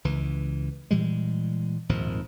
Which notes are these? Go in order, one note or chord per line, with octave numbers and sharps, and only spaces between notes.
C#2 E3
A#2 E3 G3 G#3
G#1 D#2 A#2 F3